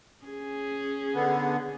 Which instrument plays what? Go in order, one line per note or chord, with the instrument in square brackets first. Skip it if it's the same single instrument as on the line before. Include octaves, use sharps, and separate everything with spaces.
[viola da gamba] C#4 G#4
[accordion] D3 B3